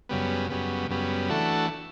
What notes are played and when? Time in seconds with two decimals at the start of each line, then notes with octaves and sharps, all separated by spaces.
0.09 F#2 C#3 G3 B3
0.50 F#2 C#3 G3 B3
0.90 F#2 C#3 G3 B3
1.30 E3 A3 D4 F#4 A4